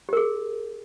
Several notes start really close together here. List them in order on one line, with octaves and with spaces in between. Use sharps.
G4 A#4 G#4